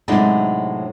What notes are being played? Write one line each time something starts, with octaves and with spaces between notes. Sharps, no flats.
A2 C3 F#3 G#3 D4 D#4